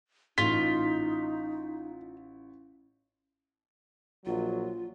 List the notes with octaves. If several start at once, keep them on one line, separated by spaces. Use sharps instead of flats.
A1 D#4 F4 B6
A#1 F#3 F4